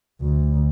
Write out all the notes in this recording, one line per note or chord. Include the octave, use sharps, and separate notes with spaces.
D2